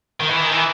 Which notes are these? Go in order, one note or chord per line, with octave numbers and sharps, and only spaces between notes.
D#3
E3
D#3
E3